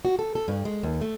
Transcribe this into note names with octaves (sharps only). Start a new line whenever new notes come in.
F#4
A4
A4
G2
G#3
D#2
A3